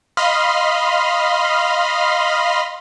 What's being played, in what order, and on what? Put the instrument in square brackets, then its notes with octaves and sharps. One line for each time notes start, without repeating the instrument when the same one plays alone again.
[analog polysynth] D#5 F5 B5 C6 F6